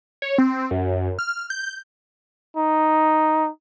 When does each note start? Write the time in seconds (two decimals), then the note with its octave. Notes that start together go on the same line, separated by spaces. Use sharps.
0.22 C#5
0.38 C4
0.71 F#2
1.19 F6
1.50 G6
2.57 D#4